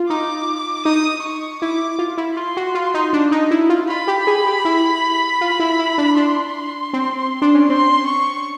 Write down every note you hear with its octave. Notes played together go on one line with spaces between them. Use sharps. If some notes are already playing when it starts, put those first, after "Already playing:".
Already playing: F4
D#4 D6
D#4 D#6
C#6
E4 D6
F4
E4
F4 C6
F#4
F4
D#4
D4
D#4
E4
F4
F4 B5
G4
G#4
G4
E4
F4
E4
E4
D4
D4 C6
C4
D4
C#4
C4 C6
C#6